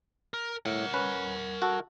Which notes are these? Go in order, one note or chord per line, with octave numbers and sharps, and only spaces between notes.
A#4
A2 A#4 F#5
C#4 B4
F#4 A4